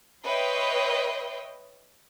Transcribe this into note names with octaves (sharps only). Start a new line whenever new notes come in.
B4 C#5 D#5 E5 G5 C6